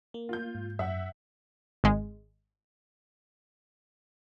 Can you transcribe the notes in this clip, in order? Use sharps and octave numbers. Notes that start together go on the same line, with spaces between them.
A#3
F4 G6
G#2
F#2 E5 F#5
G#1 G#3